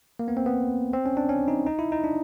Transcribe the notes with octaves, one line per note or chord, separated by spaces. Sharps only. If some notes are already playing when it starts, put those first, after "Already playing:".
A#3
B3
C4
B3
C4
C#4
D4
C#4
D#4
D#4
E4
D#4
D4